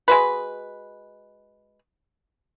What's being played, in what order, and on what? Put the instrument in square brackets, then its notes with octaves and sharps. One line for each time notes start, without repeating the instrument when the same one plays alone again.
[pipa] G#3 F#4 B4